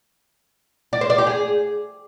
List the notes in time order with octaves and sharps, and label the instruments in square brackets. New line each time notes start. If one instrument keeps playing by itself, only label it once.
[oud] D5
C5
D5
G4
G#4